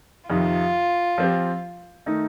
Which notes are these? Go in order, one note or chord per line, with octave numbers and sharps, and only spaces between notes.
F2 C3 D#3 F4
F3 C4 G4
D#3 A3 D#4